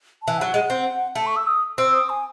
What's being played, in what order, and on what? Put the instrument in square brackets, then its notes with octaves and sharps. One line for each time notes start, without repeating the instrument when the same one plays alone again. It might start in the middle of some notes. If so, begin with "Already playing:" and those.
[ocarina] A5
[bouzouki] E3
[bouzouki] F#3 [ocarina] F#5
[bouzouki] G#3
C4
[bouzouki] A3 [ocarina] A5
[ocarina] C#6
E6
D#6
[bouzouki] C4 [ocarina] E6
[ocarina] D#6
G#5